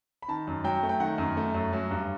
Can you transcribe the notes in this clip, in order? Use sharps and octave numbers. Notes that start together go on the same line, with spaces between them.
B5
D#3 A5
F#2
F#3 G5
A3
G5
D#3 F#5
F#2
A3
F#2
F#3
G2